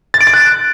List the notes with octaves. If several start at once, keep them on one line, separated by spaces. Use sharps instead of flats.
A6
D7
A6
F#6